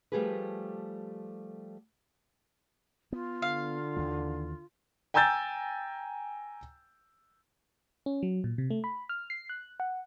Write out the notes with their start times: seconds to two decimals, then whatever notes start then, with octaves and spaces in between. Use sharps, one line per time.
0.12 F3 G3 A3 G4 G#4 B4
3.12 B3 F4
3.42 D3 F5
3.97 D#2 D#3 E3
5.14 G5 G#5 A#5 E6 G6 A6
8.06 C#4
8.23 F#3
8.44 A#2
8.58 C3
8.71 A3
8.84 B5
9.09 F6
9.30 C7
9.49 F#6
9.80 F#5